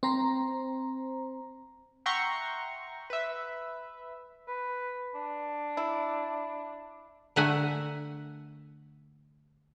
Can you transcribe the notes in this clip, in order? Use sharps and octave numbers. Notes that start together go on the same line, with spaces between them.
C4 C5 A#5
E5 F#5 G5 A#5 C6 C#6
B4 E5
B4
D4
E4
D3 A3 A#4 E5 F#5 G#5